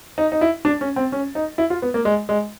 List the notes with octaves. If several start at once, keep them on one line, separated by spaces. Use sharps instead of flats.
D#4
D#4
E4
D4
C#4
C4
C#4
D#4
E4
F4
B3
A#3
G#3
G#3